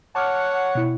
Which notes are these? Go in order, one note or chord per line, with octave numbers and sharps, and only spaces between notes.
C#5 F#5 A5 D6 F6
B2 E4